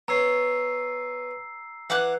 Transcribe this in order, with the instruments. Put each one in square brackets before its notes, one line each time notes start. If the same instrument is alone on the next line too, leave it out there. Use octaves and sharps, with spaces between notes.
[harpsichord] B3 C#5 [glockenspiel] A#5 E6 C7
[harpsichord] E3 [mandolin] F#5 D6 F#6